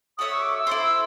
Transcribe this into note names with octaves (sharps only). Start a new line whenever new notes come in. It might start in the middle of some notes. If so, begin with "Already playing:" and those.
F#4 A4 C#5 E5 D#6
C#6
D6
E6
E4 A4 C5
E6